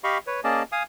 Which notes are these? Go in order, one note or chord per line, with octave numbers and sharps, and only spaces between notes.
G4 D#5 F5 B5 C#6
B4 C#5
A#3 C#4 G#4 D5 D#5 A5
F5 G#5 D#6